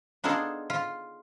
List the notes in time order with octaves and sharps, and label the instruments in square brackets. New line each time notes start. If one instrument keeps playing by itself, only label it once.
[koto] B3 D4 D#4 F4 G#4 A4
F4